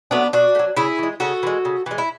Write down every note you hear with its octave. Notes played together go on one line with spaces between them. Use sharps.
F#3 A3 B3 D4
B2 D4 F#4
A3
F#3
C#3 E4 G#4
E3 G#3
C#3 F#4 A4
E3 G#3
C#3
E3 G#3
E4